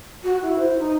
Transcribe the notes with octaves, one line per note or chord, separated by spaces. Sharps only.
F#4
E4
C5
D#4